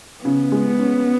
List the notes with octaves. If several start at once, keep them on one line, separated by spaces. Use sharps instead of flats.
C#3 B3
G#3
C#4